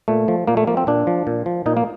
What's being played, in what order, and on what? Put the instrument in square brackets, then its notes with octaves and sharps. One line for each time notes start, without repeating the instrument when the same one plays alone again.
[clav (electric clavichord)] A#2 A3
F3
A#2 A#3
A3
F3 A#3
C4
A#2 D4
F3
A#2
F3
A#2 D#4
A#3